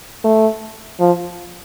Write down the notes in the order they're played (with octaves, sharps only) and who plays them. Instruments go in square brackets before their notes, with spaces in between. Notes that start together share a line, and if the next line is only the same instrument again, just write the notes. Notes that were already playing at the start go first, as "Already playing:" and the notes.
[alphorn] A3
F3